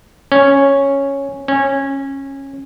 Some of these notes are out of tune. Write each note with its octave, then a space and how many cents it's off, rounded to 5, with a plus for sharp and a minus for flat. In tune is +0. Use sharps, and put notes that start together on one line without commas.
C#4 -5
C#4 -20